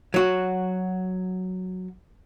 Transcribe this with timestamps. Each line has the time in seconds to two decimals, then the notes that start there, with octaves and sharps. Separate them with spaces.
0.14 F#3 F#4